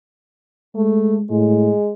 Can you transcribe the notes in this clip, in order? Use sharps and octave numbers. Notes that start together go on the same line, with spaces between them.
G#3 A3
A2 G#3